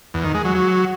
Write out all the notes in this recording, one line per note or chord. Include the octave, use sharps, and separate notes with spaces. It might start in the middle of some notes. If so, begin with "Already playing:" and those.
E2
D#3
G#3
F#3
F#3